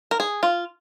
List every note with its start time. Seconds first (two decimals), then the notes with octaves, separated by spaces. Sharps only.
0.11 A#4
0.20 G#4
0.43 F4